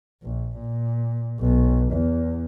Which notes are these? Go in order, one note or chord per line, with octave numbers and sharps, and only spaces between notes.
A#1
A#2
B1
E2